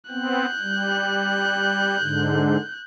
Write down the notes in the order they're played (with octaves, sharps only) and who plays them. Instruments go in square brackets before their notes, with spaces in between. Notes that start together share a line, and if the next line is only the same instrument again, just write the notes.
[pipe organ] B3 C4 [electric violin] F#6 G6
[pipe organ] G3
G#2 D3